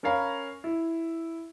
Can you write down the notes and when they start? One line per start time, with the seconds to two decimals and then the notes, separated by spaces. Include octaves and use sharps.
0.03 C#4 A#4 C#5 F5 A#5 B5
0.64 E4